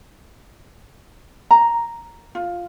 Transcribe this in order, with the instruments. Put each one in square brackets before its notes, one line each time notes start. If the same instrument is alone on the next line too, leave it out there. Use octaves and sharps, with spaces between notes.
[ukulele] A#5
F4